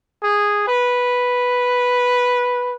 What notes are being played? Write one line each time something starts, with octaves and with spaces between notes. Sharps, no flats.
G#4
B4